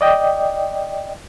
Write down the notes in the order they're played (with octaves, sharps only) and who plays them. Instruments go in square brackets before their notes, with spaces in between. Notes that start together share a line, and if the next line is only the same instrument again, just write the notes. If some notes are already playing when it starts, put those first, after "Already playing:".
[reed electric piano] D5 D#5 G5